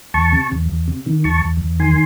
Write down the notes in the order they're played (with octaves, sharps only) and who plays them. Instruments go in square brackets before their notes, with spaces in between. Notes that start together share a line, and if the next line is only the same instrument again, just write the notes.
[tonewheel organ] E2 A5 C#6
C3
E2
E2
C3
D#3
E2 A5 C#6
E2
E2
D#3 G#5 C6